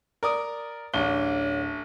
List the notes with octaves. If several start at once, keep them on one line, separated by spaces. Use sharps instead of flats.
A#4 D5 D#6
D1 A1 D4 C#5 G7